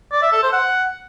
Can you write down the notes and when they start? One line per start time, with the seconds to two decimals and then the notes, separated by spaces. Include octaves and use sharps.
0.12 D5
0.22 E5
0.32 A4
0.43 C5
0.53 F#5